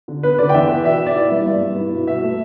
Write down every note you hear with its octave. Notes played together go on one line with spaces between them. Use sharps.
D3
B3 B4
D3 D5
G5
E2 E5
B3
B2 E5
B2
D5
E4 E5
G2
G2
G2
E4
B2
B2 E5
A3